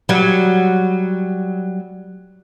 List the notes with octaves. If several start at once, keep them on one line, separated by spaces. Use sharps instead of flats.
F#3 G3